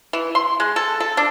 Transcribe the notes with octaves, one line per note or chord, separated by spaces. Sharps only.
E3
C6
G#3
A4
A4
D4